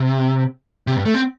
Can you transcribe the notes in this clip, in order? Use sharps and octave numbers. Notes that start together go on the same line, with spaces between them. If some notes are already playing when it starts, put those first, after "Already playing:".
Already playing: C3
C3
G2
A3
C4